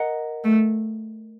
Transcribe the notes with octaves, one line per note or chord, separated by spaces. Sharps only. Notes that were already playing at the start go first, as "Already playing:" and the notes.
Already playing: A#4 D#5 F#5
A3